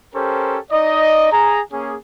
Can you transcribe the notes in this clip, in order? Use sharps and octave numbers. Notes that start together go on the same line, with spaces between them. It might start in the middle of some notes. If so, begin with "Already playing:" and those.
C#4 G4 A4 A#4 C5
D#4 D5 D#5
G#4 A#5
A#3 C#4 G#4